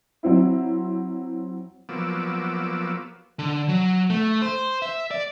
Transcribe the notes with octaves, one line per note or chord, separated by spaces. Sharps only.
F#3 C4 E4
F3 F#3 A#3 B3 D6 E6
D3
F#3
A3
C5
E5
D5